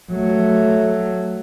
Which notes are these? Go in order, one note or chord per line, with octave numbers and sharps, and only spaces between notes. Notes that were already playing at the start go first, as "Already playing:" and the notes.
F#3 A3